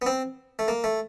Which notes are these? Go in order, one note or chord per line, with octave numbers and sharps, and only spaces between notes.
B3
C4
A3
A#3
A3